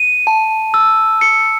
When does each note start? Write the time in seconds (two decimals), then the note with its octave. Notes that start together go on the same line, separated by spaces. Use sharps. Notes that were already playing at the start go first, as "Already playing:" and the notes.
Already playing: D#7
0.27 A5
0.74 E6
1.21 C#7